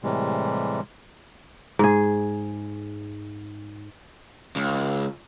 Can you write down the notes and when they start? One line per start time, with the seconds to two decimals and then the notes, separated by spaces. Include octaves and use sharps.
0.04 A2 C3 E3 G3 G#3
1.79 G#2 G#4
4.56 C#2